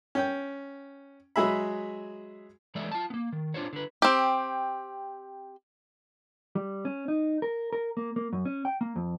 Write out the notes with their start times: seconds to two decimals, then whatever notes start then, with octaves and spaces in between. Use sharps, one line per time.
0.15 C#4 G5
1.36 F#3 G#3 G#4 E5 B5
2.75 E3 G#3 A4 D5 E5
2.91 F4 A5
3.10 A#3 B3
3.33 D#3
3.54 D4 F4 C5 C#5
3.73 D3 B4
4.02 C4 G4
6.55 G3
6.85 C#4
7.08 D#4
7.42 A#4
7.73 A#4
7.97 A#3
8.16 A#3
8.33 F#2
8.45 C#4
8.65 G5
8.81 A#3
8.96 F2